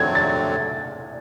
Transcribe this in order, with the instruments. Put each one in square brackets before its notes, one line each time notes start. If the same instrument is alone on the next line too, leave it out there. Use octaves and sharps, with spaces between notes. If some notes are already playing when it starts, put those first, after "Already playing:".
Already playing: [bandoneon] F2 D3 F#3 A3 C4 [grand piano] G#6 A6
[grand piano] A6